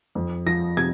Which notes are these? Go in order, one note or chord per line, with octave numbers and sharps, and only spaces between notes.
F2
F3 A#6
C3 G#6